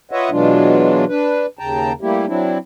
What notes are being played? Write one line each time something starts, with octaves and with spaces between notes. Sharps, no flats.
F4 B4 C#5 D#5 E5 F#5
B2 E3 F#3 G#3 D4 F4
D4 B4
D#2 C#3 G5 A5 A#5
G3 A3 A#3 E4 G4
F#3 C4 D4 E4